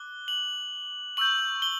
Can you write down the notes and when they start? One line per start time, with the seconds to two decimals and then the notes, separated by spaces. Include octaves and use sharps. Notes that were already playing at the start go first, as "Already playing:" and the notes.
Already playing: D6 F#6 G7
0.28 F#7
1.17 C#6 E6 G6 F#7
1.62 G7